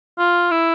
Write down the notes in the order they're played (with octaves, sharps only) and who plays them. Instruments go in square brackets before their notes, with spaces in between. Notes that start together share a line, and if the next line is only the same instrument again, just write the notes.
[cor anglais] F4
E4